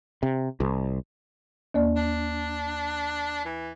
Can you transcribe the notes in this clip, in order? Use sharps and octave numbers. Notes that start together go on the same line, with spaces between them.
C3
C2
D#2 A#3 D5
D4
E3